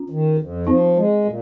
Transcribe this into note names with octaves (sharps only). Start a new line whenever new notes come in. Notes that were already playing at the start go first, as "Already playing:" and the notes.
Already playing: C#4 F4
D#3
F2
F3 C4 D#4
G#3
A#2